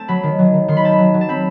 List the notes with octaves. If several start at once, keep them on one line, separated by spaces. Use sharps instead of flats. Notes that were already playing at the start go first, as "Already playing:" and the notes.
Already playing: A3 C4 A5
F#3 B5
D#3
F#3
D#3
D#3 C6
B5
C4 A5
B5
F#3
F#3
A5
C4 B5